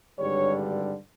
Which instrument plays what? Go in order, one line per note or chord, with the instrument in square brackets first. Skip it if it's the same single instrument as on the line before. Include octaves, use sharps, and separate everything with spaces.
[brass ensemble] G#1 G2 D3 G3 C#5